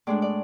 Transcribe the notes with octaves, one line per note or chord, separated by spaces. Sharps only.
A2 G#3 D4 D5
D5